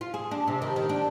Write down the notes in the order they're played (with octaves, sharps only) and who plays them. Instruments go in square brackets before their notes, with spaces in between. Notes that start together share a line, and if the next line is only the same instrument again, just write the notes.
[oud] F4
G#4
D4
C3
D#3
D#3
D4